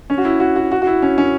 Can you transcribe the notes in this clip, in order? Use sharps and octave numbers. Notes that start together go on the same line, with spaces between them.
C#4
F#4
E4
F#4
F#4
F#4
F#4
E4
C#4
C#4